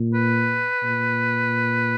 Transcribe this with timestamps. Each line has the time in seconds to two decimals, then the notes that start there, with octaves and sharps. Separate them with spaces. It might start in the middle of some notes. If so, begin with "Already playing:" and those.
Already playing: A#2
0.14 B4
0.83 A#2